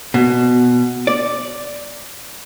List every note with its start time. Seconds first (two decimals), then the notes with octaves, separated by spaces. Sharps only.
0.14 B2
1.07 D5